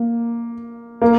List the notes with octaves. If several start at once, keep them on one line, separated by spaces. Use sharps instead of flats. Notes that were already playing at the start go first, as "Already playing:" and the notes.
Already playing: A#3
A#3